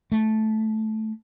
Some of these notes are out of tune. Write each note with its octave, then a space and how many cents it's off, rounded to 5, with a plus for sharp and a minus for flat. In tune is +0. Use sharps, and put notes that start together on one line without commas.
A3 -10